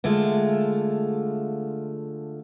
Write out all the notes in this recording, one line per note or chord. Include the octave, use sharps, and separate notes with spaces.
D3 G#3 A3 F4